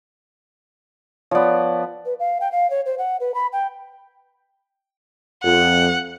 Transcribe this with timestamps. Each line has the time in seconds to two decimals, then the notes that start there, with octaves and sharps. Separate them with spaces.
1.31 F3 B3 C#5 D5
2.06 B4
2.19 F5
2.40 G5
2.52 F5
2.70 C#5
2.86 C5
2.98 F#5
3.20 B4
3.34 B5
3.53 G5
5.44 F2 F#5